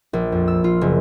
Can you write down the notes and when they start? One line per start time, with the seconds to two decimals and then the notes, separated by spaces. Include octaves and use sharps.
0.13 A#1
0.32 F2
0.48 E6
0.64 F4
0.81 F#1